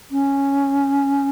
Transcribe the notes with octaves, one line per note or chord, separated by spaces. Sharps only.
C#4